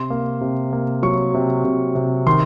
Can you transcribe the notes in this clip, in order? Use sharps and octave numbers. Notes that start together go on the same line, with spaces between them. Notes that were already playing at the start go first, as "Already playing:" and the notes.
Already playing: C3 C6
A#3
C3
A#3
F#3 C#6
C3
C3
C3
D#3 C6